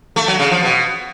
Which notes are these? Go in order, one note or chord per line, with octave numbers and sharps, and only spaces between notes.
A3
F#3
C#3
F3
B2